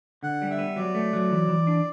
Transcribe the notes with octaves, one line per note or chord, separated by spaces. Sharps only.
D3 F#5
G3
E5
B3
F#3 D5
A3
F#3
E3
E3
D4